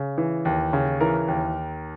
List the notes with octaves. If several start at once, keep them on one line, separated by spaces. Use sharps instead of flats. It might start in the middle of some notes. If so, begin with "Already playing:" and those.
Already playing: C#3
E3
D#2
C#3
E3 A#4
D#2